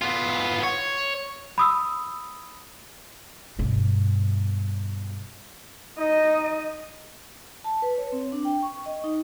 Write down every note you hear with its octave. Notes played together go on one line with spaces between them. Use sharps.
B3 F4
C#5
B5 D#6 E6
G2 B2
D#4 D#5
A5
B4
C#5
C4
D4
G5
C#6
D#5
D#4